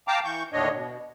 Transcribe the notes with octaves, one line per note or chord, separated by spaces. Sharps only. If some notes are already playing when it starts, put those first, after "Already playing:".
F5 G5 A5 A#5 D6
E3 C#6 G6
D#2 A2 D3 D4 C#5 D#5
B2